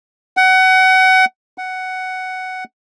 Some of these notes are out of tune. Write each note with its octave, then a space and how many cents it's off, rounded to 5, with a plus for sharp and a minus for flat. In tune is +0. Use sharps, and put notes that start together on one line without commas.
F#5 +25
F#5 +10